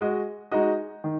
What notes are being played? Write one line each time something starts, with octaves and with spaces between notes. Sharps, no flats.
G#3 F#4 D#5
G#3 D#4 F#4 D#5
D#3